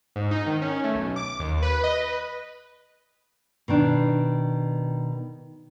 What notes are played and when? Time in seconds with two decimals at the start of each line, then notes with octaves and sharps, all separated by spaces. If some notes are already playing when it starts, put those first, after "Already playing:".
0.16 G#2
0.31 D#4
0.47 D#3
0.62 C#4
0.84 A3
0.95 B1
1.16 D6
1.40 D#2
1.62 B4
1.84 D#5
1.98 B4
3.68 B2 D#3 D4